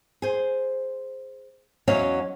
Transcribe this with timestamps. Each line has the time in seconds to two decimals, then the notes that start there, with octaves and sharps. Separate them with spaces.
0.22 G#4 C5
1.87 E2 F#3 C#4 E4 D#5 F5